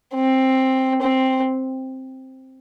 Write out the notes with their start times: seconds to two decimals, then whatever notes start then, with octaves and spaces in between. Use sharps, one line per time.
0.14 C4
1.02 C4